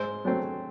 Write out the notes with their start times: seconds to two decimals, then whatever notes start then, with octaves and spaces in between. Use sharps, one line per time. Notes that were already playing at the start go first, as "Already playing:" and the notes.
Already playing: G#2 C5
0.25 F#3 A3 C4